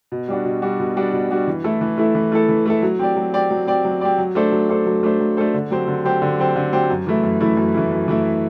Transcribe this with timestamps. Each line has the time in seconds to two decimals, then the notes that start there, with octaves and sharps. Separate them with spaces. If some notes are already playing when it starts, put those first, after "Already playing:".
0.12 B2
0.28 G3 D4 F#4
0.45 B2
0.62 G3 D4 F#4
0.80 B2
0.97 G3 D4 F#4
1.13 B2
1.30 G3 D4 F#4
1.48 E3
1.64 A3 E4 A4
1.81 E3
1.98 A3 E4 A4
2.15 E3
2.32 A3 E4 A4
2.49 E3
2.66 A3 E4 A4
2.83 F#3
2.99 C4 G4 D5
3.16 F#3
3.34 C4 G4 D5
3.51 F#3
3.67 C4 G4 D5
3.85 F#3
4.01 C4 G4 D5
4.18 F#3
4.35 A3 D4 A4 C5
4.52 F#3
4.69 A3 D4 A4 C5
4.86 F#3
5.03 A3 D4 A4 C5
5.20 F#3
5.37 A3 D4 A4 C5
5.54 D3
5.71 F#3 C4 G4 C5
5.88 D3
6.05 F#3 C4 G4 C5
6.22 D3
6.39 F#3 C4 G4 C5
6.56 D3
6.72 F#3 C4 G4 C5
6.90 F#2
7.07 E3 A3 E4
7.23 F#2
7.41 E3 A3 E4
7.57 F#2
7.74 E3 A3 E4
7.91 F#2
8.08 E3 A3 E4